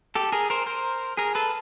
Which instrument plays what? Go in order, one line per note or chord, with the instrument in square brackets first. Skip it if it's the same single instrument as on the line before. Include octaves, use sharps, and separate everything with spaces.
[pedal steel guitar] G4 A4
G#4 A#4
A#4 C5
A#4 C5
G#4 A#4
A4 B4